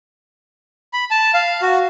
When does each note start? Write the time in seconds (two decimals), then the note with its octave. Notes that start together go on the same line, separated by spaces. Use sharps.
0.93 B5
1.11 A5
1.34 F5
1.62 F#4